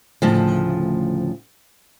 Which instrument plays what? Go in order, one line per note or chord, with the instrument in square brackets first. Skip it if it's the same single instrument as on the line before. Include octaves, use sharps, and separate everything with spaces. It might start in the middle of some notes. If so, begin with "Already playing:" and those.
[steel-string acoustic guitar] D2 A2 C#3 F3